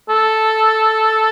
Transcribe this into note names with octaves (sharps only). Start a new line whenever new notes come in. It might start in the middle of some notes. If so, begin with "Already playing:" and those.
A4